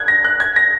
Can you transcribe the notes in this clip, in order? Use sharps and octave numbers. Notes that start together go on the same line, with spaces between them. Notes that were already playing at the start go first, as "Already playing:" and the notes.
Already playing: F#6 G#6
A#6
F#6
G#6
A#6